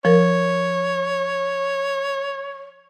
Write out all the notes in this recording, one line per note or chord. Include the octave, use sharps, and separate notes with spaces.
F3 A#4 C#5